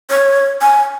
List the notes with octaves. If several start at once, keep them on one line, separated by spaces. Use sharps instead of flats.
C#5
G#5